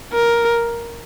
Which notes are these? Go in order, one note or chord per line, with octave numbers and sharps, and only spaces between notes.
A#4